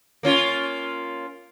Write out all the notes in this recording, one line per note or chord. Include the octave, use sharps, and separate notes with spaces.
A#3 C#4 F4